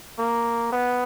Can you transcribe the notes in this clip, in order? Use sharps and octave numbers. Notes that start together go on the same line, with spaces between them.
A#3
B3